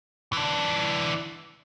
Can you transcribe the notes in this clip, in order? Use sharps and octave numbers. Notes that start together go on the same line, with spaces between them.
E3 D4